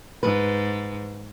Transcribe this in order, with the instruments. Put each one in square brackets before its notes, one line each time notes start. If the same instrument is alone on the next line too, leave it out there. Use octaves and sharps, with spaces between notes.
[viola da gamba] G#2 [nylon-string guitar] B4